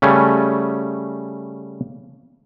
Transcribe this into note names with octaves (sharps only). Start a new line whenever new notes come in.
C#3 G3 A3 C#4